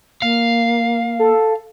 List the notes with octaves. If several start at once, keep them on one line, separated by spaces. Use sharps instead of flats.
A#3 F5
A4